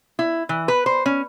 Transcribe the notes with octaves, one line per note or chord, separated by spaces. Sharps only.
E4
E3
B4
C5
C#4